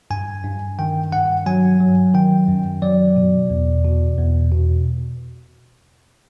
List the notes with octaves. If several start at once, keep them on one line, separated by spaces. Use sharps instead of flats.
G2 G#5
G2
D#3 G5
G2 F#5
F#3 G#5
F#3
D#3 G5
F#2
F#3 D5
B2
E2
B2
E2
B2